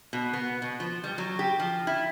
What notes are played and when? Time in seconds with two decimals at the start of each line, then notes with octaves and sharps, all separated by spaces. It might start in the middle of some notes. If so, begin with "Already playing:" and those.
0.13 B2
0.33 B3
0.62 B2
0.80 F3
1.04 G3
1.18 F#3
1.39 G4
1.60 F3
1.87 E4